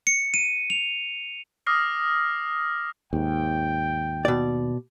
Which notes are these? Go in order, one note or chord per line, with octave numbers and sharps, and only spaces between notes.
C#7
D#7
F7
D6 D#6 F6 A#6 C7
D#2 G#2 G5
B2 D5